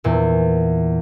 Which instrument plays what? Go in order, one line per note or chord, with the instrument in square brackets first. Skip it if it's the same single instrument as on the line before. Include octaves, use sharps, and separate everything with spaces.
[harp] E2 A#2